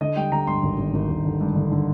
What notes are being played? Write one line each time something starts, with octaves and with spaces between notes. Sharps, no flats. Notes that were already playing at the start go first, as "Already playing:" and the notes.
D3 D#5
G3 G5
D3 A#5
G2 C6
G#1
G#1
G#1
G#1
D3
G2
D3
D3